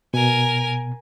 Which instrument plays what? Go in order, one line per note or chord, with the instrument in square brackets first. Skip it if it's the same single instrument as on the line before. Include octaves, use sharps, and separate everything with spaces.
[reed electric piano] B2 [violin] A#4 G#5